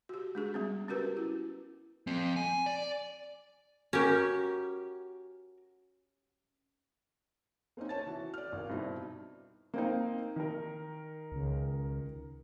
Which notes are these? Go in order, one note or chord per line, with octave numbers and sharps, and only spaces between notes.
F#4 G4
G#3 D4 G#4
G3 B3 C#4
C#4 F#4 G4 A#4 B4
E4
F3 C4
G#5
D5
C#4 F#4 G4 A#4
A#3 C4 C#4 D#4
C#5 A5 A6
E3 F#4
D5 F6
G#1
G2 B2 C4 D#4 E4
A#3 C4 D#4
D#3 A#4
C#2